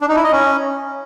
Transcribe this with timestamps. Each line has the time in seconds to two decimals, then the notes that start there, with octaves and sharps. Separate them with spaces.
0.01 D4
0.08 D#4
0.16 E4
0.24 D#5
0.32 C#4